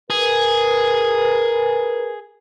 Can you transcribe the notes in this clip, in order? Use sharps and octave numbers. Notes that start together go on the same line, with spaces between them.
G#4 A#4 B4